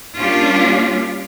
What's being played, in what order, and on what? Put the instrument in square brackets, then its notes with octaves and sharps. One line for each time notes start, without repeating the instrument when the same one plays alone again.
[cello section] G3 A#3 C#4 D4 F4 G4